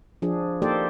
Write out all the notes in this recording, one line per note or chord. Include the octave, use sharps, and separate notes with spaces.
F3 D4 G#4
A#3 D#4 G4 A4 C5 D5